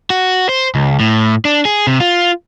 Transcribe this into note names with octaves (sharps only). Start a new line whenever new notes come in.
F#4
C5
C#2
A2
D4
G#4
C3
F4